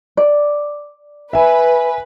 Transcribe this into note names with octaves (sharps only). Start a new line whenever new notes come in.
D5
B4 E5 G#5